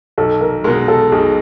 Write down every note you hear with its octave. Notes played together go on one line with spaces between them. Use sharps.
B1 A4
A#4
B2 G#3 A#4
A4
B1 G#4